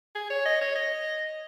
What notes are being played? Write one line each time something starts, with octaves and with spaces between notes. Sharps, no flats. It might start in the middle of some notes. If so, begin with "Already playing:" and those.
G#4
C#5
D#5
C#5
D#5